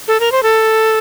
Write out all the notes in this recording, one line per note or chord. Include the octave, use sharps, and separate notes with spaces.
A4
A#4
C5
A4